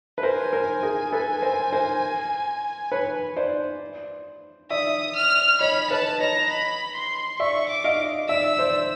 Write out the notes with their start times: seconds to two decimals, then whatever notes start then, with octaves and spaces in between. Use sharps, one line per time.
0.18 B4
0.23 A#4 C5 G#5
0.53 A#4 C5
0.83 G#4 A#4
1.13 A4 B4
1.42 A#4 C5
1.73 A#4 C5
2.92 B4 C#5
3.36 C5 D5
4.70 D5 E5 D#6
5.16 F6
5.61 C#5 D#5 B5
5.90 B4 C#5 A5
6.20 C#5 D#5 A#5
6.50 B5
6.95 C6
7.39 D5 E5 C#6
7.69 D6
7.84 D#5 F5
8.29 D5 E5 E6
8.59 C5 D5